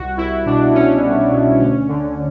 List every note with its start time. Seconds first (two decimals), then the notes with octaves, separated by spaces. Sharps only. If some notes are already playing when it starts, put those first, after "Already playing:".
Already playing: C2 F#4
0.17 C2 E4
0.45 B2 D4
0.74 B2 C#4
1.03 C2
1.31 B2
1.59 D2 C#4
1.88 D3